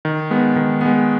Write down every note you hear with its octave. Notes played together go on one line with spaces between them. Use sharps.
D#3
G#3 B3
D#3
G#3 B3